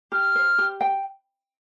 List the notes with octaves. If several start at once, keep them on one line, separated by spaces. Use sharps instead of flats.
G4 F6
C5
G4
G5